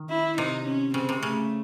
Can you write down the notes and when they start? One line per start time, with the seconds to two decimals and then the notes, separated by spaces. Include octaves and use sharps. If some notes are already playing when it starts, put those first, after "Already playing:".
Already playing: D#3
0.09 E4
0.37 C3 D#4
0.66 C#4
0.94 C#3 C4
1.09 C3
1.23 C#3 A3